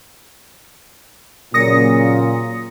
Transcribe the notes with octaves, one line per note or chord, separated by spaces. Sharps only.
A#2 C#3 F#3 A#3 D#6 A#6 C#7